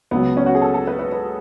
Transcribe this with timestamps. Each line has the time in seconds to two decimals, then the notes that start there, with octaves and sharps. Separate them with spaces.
0.11 C#2 C#3 F#3 B3
0.37 C#4
0.46 F#4
0.55 G#4
0.62 A4
0.74 A4
0.87 B4
0.99 B4
1.12 B4